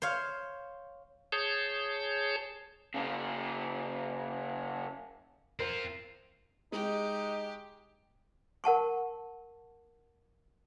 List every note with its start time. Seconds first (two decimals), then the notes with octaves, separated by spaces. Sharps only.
0.02 C5 C#5 F5
1.32 G#4 C#5 A5 G6
2.94 C#3 A#3
5.59 C4 F4 A#4 C5
6.72 G#3 D#4 G4
8.64 A#4 F#5 A5 C#6